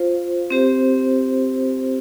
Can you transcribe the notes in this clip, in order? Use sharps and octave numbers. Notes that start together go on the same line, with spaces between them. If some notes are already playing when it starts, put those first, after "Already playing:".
Already playing: F4 C5 F5
C4 G4 C5